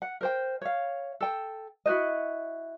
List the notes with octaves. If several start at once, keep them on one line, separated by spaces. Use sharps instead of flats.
F#5
A#4 C5 G5
C#5 F5
A4 G5
E4 F#4 C5 D#5